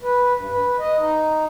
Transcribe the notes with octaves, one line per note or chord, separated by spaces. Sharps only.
B4
G2
B4
D#5
D#4